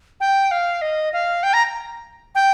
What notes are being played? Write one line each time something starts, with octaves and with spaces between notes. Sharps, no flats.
G5
F5
D#5
F5
G5
A#5
G5